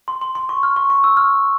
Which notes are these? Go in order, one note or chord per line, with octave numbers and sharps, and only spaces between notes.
C6
C6
C6
C#6
F6
C#6
C#6
E6
F6